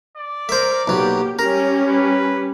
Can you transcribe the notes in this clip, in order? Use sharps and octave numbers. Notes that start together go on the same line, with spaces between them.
D5
A#4 C5 E5
B1 F#3 A#3 G4
G3 C#4 G4 A#4
B4